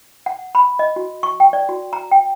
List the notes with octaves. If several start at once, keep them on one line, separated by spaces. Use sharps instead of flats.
F#5
B5
D#5
F#4
C#6
G5
D5
F#4
A#5
G5